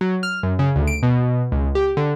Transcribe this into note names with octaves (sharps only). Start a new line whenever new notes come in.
F#3
F6
F#2
C#3
D2
D7
B2
C#2
G4
D3